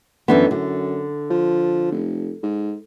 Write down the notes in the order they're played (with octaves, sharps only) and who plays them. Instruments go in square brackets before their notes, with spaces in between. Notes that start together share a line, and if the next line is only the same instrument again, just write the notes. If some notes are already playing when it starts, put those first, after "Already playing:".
[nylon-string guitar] F#2 E3 B3 [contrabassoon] D3
[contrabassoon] F#2 [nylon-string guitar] D3
[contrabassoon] F3
F1
G#2